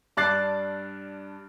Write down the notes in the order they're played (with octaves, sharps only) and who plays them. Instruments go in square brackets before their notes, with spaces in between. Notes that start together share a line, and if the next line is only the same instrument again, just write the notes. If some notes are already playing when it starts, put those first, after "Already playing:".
[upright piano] G2 D4 D6 F#6 A6 C7